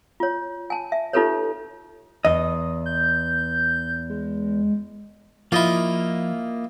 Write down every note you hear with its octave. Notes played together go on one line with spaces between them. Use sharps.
F4 C#5
G#5 A5
E5
D#4 F4 G4 A4 B4 C#5
E2 D#5
G6
G#3
F3 A#3 E4 F4 D#5